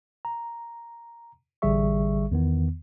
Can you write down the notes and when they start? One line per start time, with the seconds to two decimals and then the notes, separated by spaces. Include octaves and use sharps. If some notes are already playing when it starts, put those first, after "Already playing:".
0.25 A#5
1.62 A1 D3 G3 G#4 E5 C#6
2.32 E2 D#3 B3